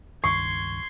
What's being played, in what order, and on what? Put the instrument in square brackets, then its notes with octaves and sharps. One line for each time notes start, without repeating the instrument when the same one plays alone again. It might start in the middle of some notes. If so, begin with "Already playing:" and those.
[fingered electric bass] C#2 G2 D#3 [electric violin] C6 G#6 [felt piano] C#6 [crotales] C7